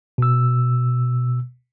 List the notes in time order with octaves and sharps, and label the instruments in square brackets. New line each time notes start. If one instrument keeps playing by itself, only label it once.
[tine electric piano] B2 E6